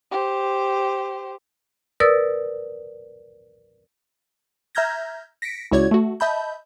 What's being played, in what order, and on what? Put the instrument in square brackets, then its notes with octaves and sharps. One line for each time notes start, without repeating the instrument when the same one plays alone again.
[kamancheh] G4 C5
[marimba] A#4 B4 D5 D#6 E6 A6
[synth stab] E5 A#5 F6 G6 G#6 A#6
A#6 B6 C#7 D7
C#2 E4 F#4 C#5 D5 G#6
A3 F#4
D#5 E5 A5 B5 G6